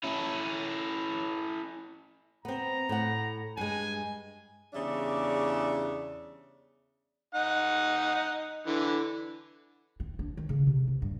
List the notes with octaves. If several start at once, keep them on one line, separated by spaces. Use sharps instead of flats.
C#4 E4
B3 C4 A#5
A2 F#5
G2 G#3 G#5
E2 C#3 G3 D4 D5 E5
D#4 F#5
D3 E3
C4
D4
D#3
C#3
C3
E3
G2